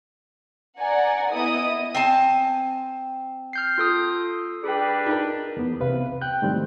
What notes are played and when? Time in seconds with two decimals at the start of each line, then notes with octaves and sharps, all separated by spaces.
0.78 D5 F#5 G#5 A#5
1.29 B3 E4 D#5 D#6
1.95 C4 G#5 A5
3.53 F6 G6 C7
3.78 F4 A4 D#6
4.64 G3 D4 G#4 B4 G5
5.06 D#4 F4 A#4
5.57 E2 B3
5.80 C2 C3 B4 F5
6.21 G5 F#6 G6
6.42 G#2 D#3 F3 G3 A3 C4